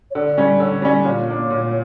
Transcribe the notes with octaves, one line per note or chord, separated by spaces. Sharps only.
C#5
D3 D5
G3 C#4
D3 C#5
G3 C#4 D5
A#2 C#5
A#3 D4
A#2